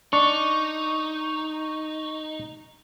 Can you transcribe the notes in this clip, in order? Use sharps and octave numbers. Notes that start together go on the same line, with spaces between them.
D4 D#4 C#6